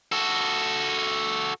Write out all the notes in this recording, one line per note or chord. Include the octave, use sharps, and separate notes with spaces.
F#4 A4